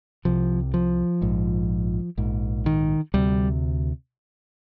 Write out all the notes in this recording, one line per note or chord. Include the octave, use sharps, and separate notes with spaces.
C2 C3 F3
F3
A#1 G#2
A#1 G#2
D#3
D2 C3 G3